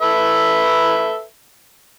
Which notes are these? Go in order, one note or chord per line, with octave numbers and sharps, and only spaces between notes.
A4 B4 E5